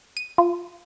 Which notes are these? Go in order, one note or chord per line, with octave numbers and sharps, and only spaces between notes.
D#7
F4